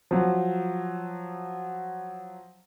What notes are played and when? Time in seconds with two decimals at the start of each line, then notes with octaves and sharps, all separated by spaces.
0.11 F3 F#3